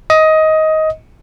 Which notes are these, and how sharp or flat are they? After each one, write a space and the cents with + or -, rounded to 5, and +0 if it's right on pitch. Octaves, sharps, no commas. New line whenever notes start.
D#5 +15